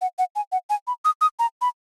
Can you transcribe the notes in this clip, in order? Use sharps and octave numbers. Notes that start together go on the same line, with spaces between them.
F#5
F#5
G#5
F#5
G#5
B5
D#6
D#6
A#5
B5